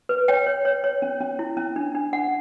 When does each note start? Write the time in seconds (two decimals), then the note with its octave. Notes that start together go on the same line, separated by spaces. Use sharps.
0.09 B4
0.28 C#5 G5
0.46 C#5
0.65 C#5
0.84 C#5
1.02 C#4
1.20 C#4
1.39 E4
1.57 C#4
1.76 D4
1.95 D4
2.13 D4 F#5